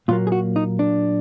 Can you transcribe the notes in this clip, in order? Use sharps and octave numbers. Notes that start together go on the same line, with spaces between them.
A#2 F#3 A#3 F4
G#4
F#4
D#4
D4